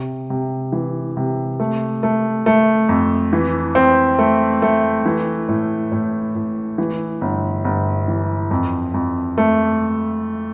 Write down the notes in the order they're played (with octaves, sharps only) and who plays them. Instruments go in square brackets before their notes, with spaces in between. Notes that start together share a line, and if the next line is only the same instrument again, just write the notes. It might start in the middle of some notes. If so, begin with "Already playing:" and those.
Already playing: [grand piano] C3
C3
E3
C3
A3
A3
A3
F2
E3
C4
A3
A3
E3
A2
A2
A2
E3
G1
G1
E3
F2
F2
A3